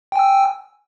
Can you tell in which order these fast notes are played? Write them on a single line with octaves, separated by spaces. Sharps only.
G5 G#5 E6